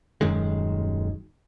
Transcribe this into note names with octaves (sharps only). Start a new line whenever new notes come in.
D#1 F#2 D#3 G#3